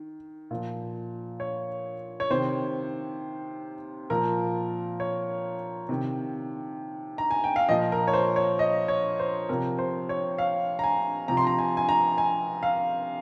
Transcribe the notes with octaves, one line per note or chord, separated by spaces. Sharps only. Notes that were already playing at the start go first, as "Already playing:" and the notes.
Already playing: D#3
A#2 F3
C#5
C#5
C3 D#3 C5
A#2 F3 A#4
C#5
C3 D#3
A#5
G#5
G5
F5
A#2 F3 D#5
A#4
C#5
C5
C#5
D#5
C#5
C5
C3 F3 A#4
C5
C#5
F5
A#5
G#5
C3 F3 A#5
C6
A#5
G#5
G#5
A#5
G#5
F5